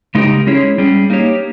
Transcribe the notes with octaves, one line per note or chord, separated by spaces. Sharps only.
C#3 G#3 D#4 G4 A#4
G#3 C#4 E4 G#4 C#5
G3 C#4 G#4
A#3 D#4 G4 C#5